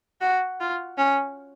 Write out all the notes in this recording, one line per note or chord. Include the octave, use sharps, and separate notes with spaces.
F#4
F4
C#4